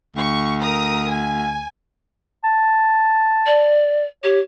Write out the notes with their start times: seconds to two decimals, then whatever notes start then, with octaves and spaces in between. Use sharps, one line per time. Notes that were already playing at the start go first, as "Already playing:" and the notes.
0.16 D2 C#6
0.61 A#4 A#5 D#6
1.08 G#5
2.44 A5
3.46 D5
4.23 G4 C#5